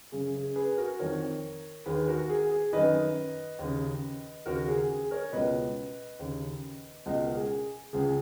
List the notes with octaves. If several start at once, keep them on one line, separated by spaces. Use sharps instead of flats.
F#2 C#3 G#4
G#4
G#4 B4
F#4 A#4
F2 D#3 A#4 C#5
D#2 D#3 G#4 B4
F#4 A#4
G#4
G#4
F#2 D#3 B4 D#5
D#2 C#3
D#2 C#3 F#4 A#4
G#4
G#4
A#4 C#5
C#2 B2 B4 D#5
D#2 C#3
C#2 B2 D#5 F#5
A#4
G#4
C#2 C#3 G#4